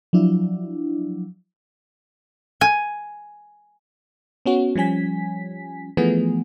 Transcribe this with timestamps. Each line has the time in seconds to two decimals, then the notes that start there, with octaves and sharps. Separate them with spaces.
0.13 F3 F#3 D4 E4
2.61 G#5
4.46 B3 C#4 F#4
4.76 F3 G3 C#4 G#5 B6
5.97 E3 F3 A3 B3 G#4